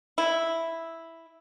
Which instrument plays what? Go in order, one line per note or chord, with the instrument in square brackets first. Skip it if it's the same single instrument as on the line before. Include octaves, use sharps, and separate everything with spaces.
[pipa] E4